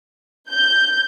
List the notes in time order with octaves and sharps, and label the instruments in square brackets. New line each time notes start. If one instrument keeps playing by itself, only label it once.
[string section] G6